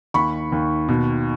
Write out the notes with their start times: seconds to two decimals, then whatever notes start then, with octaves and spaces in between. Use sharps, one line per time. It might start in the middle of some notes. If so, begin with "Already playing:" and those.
0.14 D#2 B5 C#6
0.52 D#2
0.88 B2